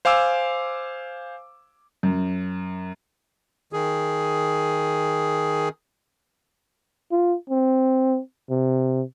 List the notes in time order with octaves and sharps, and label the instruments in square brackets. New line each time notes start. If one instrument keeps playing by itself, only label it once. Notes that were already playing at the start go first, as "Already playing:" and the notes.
[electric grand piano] C5 F5 G#5 D6 E6
[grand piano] F#2
[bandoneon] D#3 G#4
[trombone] F4
C4
C3